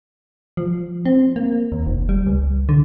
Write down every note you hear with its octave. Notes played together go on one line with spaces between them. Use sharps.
F3
C4
A#3
D#2
F1
G3
C#2
D3